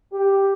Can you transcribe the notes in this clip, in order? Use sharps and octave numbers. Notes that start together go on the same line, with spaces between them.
G4